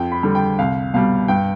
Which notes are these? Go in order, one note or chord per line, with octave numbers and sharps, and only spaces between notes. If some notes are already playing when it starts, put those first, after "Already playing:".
Already playing: F2 G5
B5
D3 G3
G5
C2 F5
B2 G3 F5
G2 G5